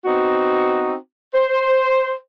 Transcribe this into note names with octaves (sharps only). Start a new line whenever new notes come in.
B3 C4 D#4 F#4
C5